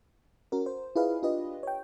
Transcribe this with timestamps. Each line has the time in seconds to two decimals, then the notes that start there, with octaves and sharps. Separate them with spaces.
0.52 C#4 F#4 A#4
0.66 C5
0.96 E4 F4 G#4 B4 D#5 F5
1.23 D4 F4 G4 B4 D#5
1.63 C#5 G5